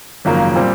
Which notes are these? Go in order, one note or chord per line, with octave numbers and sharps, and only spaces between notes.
G#1 F#2 C#3 F3 A#3
A#2 G3 C4